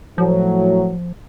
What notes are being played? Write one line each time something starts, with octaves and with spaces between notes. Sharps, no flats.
A2 F3 F#3